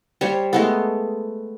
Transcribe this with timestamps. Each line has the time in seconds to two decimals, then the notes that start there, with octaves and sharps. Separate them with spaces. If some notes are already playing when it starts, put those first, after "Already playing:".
0.21 G3 C5 C#5
0.53 G#3 A3 B3